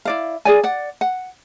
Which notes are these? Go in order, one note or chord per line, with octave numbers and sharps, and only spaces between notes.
E4 D5 F5
G#4 D5 G#5
D5 F#5
F#5